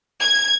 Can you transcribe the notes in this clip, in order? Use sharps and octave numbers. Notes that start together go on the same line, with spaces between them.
G#6